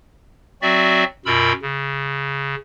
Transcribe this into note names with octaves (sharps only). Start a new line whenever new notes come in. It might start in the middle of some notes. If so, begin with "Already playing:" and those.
F#3 C4 F#4 D5 E5
F#2 B2 F4 A#4 B5 E6
C#3